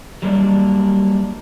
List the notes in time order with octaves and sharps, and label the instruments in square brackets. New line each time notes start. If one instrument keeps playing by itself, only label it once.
[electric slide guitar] F#3 G3 A#3 D4